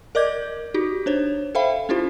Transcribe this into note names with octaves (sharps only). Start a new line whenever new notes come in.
A#4 D5 D#5 D6 G6 G#6
D#4 F#4 G4
D4 C5 C#5
A4 C5 E5 F5 G5 B5
C#4 E4 F4 G4 C5